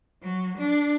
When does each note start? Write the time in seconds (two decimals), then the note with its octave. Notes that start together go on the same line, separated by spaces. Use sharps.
0.22 F#3
0.57 D4